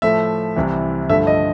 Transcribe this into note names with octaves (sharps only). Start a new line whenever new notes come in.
A2 F3 A3 E5
C2 C3 E3
G2 D3 F3 A3 E5
D#5